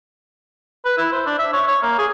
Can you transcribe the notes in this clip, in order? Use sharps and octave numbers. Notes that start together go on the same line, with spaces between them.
B4
E4
C5
D4
E5
C#5
C#5
A#3
G#4